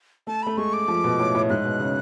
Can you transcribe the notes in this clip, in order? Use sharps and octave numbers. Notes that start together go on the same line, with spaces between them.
A3 A5
A3 B5
G#3 C#6
D6
F3
B2
A2
A2
G#2 F#6
B2
C#3